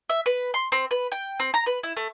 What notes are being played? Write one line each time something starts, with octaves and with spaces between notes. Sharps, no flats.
E5
B4
C6
C4
B4
G5
C4
A#5
B4
E4
A3